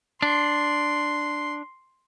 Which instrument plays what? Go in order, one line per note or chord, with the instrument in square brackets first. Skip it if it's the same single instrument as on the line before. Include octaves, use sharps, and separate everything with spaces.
[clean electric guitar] D4 [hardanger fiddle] C6